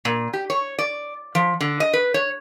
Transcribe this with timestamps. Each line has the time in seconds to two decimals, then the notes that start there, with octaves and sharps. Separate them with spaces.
0.05 A#2
0.33 G4
0.50 C#5
0.79 D5
1.35 F3
1.61 D3
1.80 D#5
1.93 B4
2.14 C#5